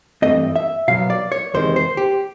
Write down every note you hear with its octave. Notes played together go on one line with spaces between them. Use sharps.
G2 E3 A3 C4 D#5
E5
B2 F#3 B3 F5
D5
C#5
E2 C3 D#3 G#3 C5
C5
G4